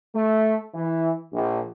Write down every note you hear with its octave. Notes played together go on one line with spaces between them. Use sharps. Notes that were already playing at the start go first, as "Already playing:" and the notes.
A3
E3
A#1